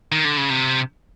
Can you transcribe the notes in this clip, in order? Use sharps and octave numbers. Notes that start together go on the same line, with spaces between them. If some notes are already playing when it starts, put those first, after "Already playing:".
D#3
D3
C#3
C3